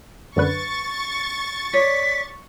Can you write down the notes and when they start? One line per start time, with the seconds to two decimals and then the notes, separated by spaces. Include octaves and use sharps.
0.36 F#2 D3 B4 C#6 A6
1.73 C#5 D5 B6